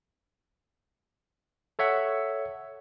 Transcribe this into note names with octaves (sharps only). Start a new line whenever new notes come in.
A4 C#5 E5 F#5